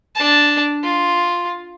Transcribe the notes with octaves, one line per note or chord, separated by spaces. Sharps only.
D4 A5
F4